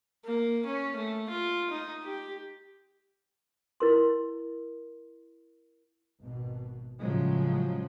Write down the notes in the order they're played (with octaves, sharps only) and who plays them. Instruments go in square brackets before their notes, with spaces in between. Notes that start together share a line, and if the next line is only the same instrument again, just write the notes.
[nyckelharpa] A#3
C#4
A3
F4
D#4
G4
[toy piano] E4 A#4 C6
[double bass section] G#1 B2
A2 C#3 F3 F#3 G#3